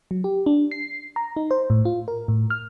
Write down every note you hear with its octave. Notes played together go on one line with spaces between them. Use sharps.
F#3
G4
D4
C7
A#5
D#4
C5
A2
F4
A#4
A2
F6